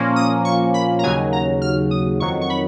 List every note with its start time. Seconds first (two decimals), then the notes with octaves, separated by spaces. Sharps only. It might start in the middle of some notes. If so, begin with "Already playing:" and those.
Already playing: A#2 F3 A#3 C#4
0.16 D#6
0.45 C#6
0.74 B5
0.99 A#5
1.03 D#2 C#3 F#3 G#5
1.33 A#5
1.62 F6
1.91 D#6
2.20 F2 D#3 F#3 C#6
2.41 C#6
2.50 B5